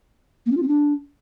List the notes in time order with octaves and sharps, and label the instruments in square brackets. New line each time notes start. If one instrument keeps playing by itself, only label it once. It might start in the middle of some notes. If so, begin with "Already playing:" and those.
[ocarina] A#3
C#4
F4
C4
D4